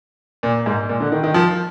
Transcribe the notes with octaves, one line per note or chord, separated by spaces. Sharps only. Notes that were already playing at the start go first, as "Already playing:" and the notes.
A#2
G#2
A#2
D3
D#3
D#3
F3